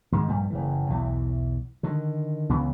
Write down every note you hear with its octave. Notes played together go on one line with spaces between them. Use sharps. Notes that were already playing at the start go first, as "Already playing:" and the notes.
G#2 D#3 E3 G#3
A#1 G2 G3 A3
F#1 C#3 E3
B1 E2 E3
D3 D#3
C#2 C#3 E3 B3